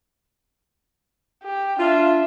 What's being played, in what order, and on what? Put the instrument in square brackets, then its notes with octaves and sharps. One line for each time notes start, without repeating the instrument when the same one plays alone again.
[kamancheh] G4
[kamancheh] D4 E5 [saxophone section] F4